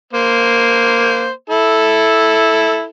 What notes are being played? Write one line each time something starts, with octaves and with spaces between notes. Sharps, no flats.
A#3 C5
E4 A4